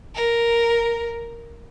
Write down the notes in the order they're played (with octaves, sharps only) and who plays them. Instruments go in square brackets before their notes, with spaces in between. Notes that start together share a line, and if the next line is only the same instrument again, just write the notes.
[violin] A#4